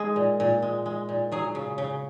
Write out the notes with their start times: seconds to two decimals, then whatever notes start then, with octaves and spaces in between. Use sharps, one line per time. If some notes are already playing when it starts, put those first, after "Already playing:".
Already playing: G#3 G#4
0.16 A#2
0.40 A#2
0.62 G#3
0.86 G#3
1.09 A#2
1.32 F#3 G#4
1.55 C#3
1.78 C#3